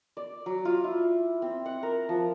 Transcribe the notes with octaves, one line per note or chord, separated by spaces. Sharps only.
D5
F#3
F4
E4
C4
F#5
A#4
F3